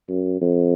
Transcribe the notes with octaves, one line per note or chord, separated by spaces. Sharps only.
F#2
F2